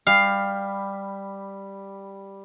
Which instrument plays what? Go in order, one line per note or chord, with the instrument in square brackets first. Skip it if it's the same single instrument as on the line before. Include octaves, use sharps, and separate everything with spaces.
[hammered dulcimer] G3 [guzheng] F5